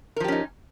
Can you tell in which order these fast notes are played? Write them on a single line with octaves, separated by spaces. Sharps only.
A#4 F3 G4 C#4 D#4